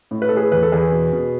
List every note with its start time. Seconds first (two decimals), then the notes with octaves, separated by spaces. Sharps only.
0.11 A2
0.22 B4
0.29 A2 A4
0.37 G#4 B4
0.52 E2 B4
0.63 A4
0.72 E2 G#4 B4
0.92 B2
1.13 B2